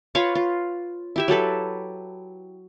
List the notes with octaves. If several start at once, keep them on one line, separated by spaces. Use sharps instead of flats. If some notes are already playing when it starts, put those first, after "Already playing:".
F4 B4 C#5 F5
F4
E4 G4 E5
F#3 G4 A4 B4